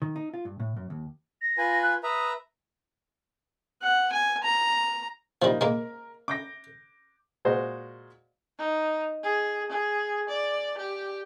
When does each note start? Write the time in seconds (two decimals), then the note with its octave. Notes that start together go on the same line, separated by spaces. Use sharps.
0.02 D#3
0.16 D#4
0.34 F4
0.45 G2
0.60 A2
0.76 F#2
0.90 D#2
1.42 A#6
1.58 F4 B4 G#5
1.82 F#6
2.03 B4 E5 A#5 D#6
3.83 F#5
4.12 G#5
4.44 A#5
5.42 F3 G3 A#3 D#4
5.61 G#3 A#3 A#4
6.28 D6 G6 A#6
7.45 A#2 G#3 F#4 C5 D#5
8.58 D#4
9.23 G#4
9.69 G#4
10.29 D5
10.78 G4